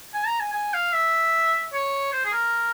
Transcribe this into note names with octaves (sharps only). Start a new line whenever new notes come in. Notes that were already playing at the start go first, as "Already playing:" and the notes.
G#5
A#5
G#5
G#5
F5
E5
C#5
C5
G#4
A#4